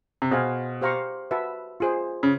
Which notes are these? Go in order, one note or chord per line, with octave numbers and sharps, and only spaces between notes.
C3
B2 G#4 C5 F5 G#5
G4 C5 F5 A#5 C#6
F#4 B4 E5 A5
F4 G#4 C5
C#3